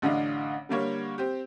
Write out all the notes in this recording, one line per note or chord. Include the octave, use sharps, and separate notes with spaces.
A1 D3 D4 D#5 F5
D3 G3 A#3 C#5
C4 G4